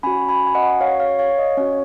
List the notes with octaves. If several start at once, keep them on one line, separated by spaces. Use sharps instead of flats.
C#4 F#4 G#5 B5
G#5 B5
G#5
D#5 F#5
C#5 F5
C#5 F5
C#5 F5
D#5
C#4 F#4 C#5